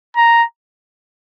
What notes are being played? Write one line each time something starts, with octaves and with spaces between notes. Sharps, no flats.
A#5